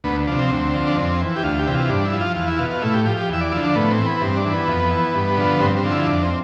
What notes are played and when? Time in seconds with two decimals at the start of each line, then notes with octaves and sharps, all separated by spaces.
0.04 D2 B3
0.27 C3 F3 D4
0.39 C4
0.51 D2
0.74 D3 F3
0.87 D4
0.97 F2 C4
1.20 E3
1.36 G4
1.43 D2 F4
1.59 G4
1.67 C3 E3
1.74 F4
1.89 G2 D4
2.05 E4
2.13 F3
2.21 F4
2.36 E2 F4
2.47 E4
2.59 B2 F4
2.71 F4
2.82 A2 E4
2.94 G4
3.06 F3 G4
3.17 G4
3.29 E2 E5
3.41 D5
3.52 D3 F3 E4
3.64 D4
3.75 A2 B3
3.91 C4
3.98 E3
4.06 B3
4.21 G2 C4
4.37 D4
4.45 E3
4.53 B3
4.67 F2
4.91 E3
5.15 G2
5.37 D3 F3
5.60 G2 C4
5.77 C4
5.83 D3 F3
5.91 E4
6.07 F2 D4
6.23 C4